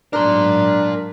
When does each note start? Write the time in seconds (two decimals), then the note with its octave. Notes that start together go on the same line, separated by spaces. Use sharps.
0.13 G#2 F#3 D4 A#4 A#5 C6